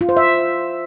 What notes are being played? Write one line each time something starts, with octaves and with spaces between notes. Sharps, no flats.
F4
C5
E5